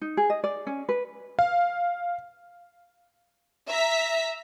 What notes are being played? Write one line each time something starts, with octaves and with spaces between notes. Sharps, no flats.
D#4
G#4
D#5
D5
C#4
B4
F5
E5 A#5 B6